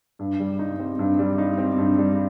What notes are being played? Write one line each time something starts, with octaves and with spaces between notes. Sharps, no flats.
G2
G3
D#4
C4
G2
G3
D#4
C4
G2
G3